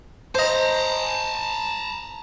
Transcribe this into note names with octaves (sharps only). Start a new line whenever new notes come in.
C5 D#5 A5 A#5